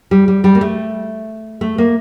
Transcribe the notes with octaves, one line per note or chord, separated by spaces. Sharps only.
G3
G3
G3
A#3
A3
A3
A#3